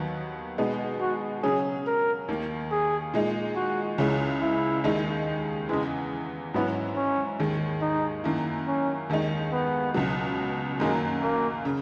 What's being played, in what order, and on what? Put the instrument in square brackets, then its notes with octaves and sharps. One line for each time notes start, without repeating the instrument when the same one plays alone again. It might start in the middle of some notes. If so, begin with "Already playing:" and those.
Already playing: [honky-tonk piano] D#2 D#3 F#3 B3
B2 G#3 B3 D#4
[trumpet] F#4
[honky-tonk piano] C#3 F#3 C#4 [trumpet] G#4
[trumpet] A#4
[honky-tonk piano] D#2 D#3 A#3
[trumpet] G#4
[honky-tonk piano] A#2 G#3 D#4
[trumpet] F#4
[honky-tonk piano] C#2 C#3 G#3 C#4 E4
[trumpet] E4
[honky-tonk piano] D#2 D#3 G#3 D#4
[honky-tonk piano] E2 C#3 E3 [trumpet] G#3
[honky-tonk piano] G#2 F#3 C#4 E4 [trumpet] B3
[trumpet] C#4
[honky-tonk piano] D#2 D#3 G#3
[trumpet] D#4
[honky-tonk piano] F#2 D#3 A#3 E4
[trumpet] C#4
[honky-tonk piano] D#2 D#3 G#3 D#4
[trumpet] B3
[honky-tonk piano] C#2 B2 F#3
[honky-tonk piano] F#2 D#3 F#3 A#3 [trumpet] G#3
[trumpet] A#3
[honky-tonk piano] C#3